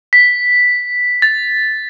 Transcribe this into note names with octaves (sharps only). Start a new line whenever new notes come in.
B6
A6